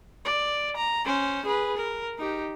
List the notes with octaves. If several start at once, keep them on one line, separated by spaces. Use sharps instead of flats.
D5
A#5
C#4 C5
G#4 B4
A#4
D#4 G4